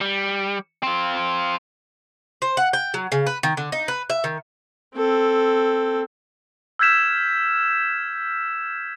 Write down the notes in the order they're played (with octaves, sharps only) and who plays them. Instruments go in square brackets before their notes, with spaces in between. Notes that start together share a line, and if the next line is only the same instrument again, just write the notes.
[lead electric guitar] G3
C4 F4
[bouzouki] C5
F#5
G5
F#3
C#3
B4
D#3
D3
D#4
B4
E5
D#3
[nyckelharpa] C4 A4
[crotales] E6 F6 G6 G#6 B6 E7